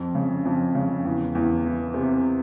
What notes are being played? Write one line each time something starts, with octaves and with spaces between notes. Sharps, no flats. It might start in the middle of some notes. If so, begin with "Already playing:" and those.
Already playing: F2
C#3
F2
C#3
E2
E2
E3
C3